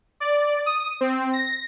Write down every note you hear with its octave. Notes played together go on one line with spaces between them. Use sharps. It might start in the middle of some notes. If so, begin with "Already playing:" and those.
D5
D#6
C4
A#6